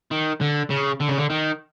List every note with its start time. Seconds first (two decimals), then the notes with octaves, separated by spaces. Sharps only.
0.11 D#3
0.41 D3
0.70 C#3
1.00 D3
1.08 C#3
1.18 D3
1.30 D#3